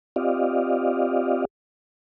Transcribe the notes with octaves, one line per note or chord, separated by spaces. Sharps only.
C4 F4 G4 D5 D#5 F5